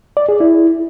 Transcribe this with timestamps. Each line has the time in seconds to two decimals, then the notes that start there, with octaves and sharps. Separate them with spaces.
0.17 D5
0.29 G#4
0.40 E4